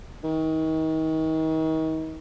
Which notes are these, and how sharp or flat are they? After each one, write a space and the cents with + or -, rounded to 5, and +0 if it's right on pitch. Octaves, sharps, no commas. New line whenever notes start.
D#3 +35